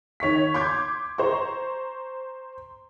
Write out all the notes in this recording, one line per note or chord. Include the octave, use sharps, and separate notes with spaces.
D#3 C#5 C#6 B6
C6 D6 G6 G#6
C5 A#5 C#6